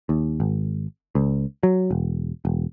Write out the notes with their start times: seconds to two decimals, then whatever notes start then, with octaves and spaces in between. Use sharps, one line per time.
0.09 D#2
0.40 G#1
1.15 C#2
1.63 F#3
1.91 E1
2.45 E1